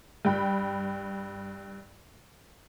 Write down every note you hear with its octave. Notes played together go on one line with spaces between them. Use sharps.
G2 G5 B5